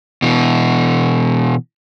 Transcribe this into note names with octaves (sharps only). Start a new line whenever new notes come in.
B2 E3